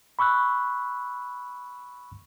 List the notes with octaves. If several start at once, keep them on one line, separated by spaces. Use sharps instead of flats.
B5 C#6 E6 F#6